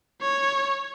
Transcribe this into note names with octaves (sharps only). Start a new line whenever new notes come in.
C#5